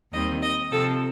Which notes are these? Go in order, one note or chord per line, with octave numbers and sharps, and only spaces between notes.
D#2 D#3 G3 C4 D#5
D#5
C3 F3 C4 A4